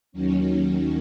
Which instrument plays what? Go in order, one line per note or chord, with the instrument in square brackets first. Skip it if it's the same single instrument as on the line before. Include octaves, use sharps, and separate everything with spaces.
[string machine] D#2 D#3 F#3 C#4